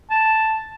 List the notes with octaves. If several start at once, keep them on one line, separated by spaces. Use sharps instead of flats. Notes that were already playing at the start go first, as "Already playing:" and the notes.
A5